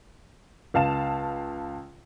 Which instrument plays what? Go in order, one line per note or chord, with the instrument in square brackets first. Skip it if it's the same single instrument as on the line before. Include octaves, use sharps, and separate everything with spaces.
[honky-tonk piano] C#2 F5 A5 E7